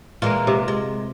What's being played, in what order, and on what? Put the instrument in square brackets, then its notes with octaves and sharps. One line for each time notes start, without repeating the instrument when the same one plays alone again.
[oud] A#2 E3 G#3 [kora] F4 A#4
[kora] C3
[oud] G#3